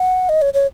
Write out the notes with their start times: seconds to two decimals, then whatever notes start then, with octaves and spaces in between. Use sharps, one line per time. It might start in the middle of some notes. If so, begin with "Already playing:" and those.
Already playing: F#5
0.29 D#5
0.42 C#5
0.54 C#5